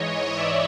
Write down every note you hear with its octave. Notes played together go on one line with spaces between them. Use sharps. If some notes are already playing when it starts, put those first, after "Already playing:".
Already playing: G#2 E3 C#5 D#5
D5 E5